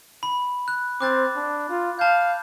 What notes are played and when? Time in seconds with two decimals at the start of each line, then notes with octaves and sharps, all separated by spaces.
0.23 B5
0.68 F#6
1.01 C4 D6 F#6 A6
1.36 D4
1.69 F4
1.99 F5 A5 G6